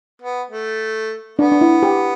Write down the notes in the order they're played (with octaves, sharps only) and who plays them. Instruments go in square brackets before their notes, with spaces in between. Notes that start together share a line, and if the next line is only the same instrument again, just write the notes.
[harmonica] B3
A3
[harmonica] B3 [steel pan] D4
[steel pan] D4
E4
G4